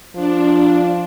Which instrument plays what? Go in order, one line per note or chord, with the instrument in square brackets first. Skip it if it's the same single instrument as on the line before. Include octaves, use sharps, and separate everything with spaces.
[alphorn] F3 [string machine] D4